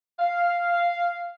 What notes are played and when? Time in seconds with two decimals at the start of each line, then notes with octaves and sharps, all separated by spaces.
0.20 F5